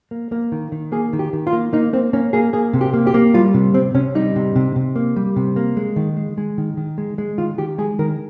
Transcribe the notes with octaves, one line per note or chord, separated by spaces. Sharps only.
A#3
A#3
D#3
D#3
A#3 G#4
D#3
G4
D#3
F4
A#3
A#3 D#4
A#3 C4
A#3 C#4
A#3 G#4
A#3 G#4
C3
G4
A#3
G4
A#3
G3 F4
C3
C3 C4
C3 C#4
G3 D#4
C3
C3
C3
A#3
G3
C3
A#3
G#3
D#3
G#3
G#3
D#3
D#3
G#3
G#3
D#3 F4
D#3 G4
G#3 G#4
D#3 A#4